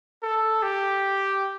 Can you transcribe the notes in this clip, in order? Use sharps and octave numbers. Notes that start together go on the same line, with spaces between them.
A4
G4